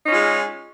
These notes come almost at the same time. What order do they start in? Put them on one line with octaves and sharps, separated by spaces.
D#4 C#4 F4 G#3